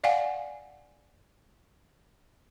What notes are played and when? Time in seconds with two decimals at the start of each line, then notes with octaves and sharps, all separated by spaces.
0.04 D5 F5 F#5 G#5